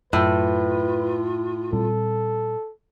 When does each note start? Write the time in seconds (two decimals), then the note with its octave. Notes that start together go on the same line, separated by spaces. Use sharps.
0.13 F#2 A2 F4 B4
1.73 A#2 G3 C4 A4